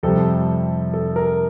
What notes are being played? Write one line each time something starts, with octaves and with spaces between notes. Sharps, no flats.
F2 C3 G3 A4
A4
A#4